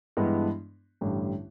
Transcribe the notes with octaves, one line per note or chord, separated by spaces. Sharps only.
G2 E3 G#3 B3 D4
A1 G2 D3 G3